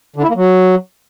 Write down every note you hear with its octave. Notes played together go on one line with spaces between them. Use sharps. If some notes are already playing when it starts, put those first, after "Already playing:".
D3
E4
A#3
F#3